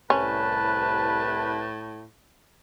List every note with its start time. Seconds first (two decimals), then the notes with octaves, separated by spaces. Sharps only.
0.10 C2 A2 C#4 B4 A5